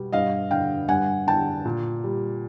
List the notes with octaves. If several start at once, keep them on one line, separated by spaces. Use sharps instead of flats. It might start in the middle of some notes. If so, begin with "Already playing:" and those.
Already playing: B2 G3
G2 D#5 F5
D3 F5 G5
G2 F#5 G#5
D3 G5 A5
A#2
G3